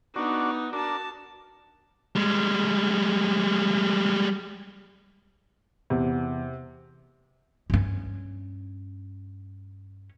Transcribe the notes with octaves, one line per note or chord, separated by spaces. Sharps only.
B3 D4 D#4 F#4
D4 F#4 A#4 A5
G3 G#3
E2 C3
G2 C#4